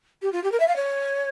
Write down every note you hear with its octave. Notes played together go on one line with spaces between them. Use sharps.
G4
F4
G4
A#4
E5
F5
C#5